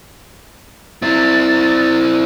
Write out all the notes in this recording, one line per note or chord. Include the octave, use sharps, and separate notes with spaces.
C4 E4 A6